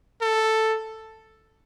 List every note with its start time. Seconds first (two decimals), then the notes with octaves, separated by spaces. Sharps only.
0.22 A4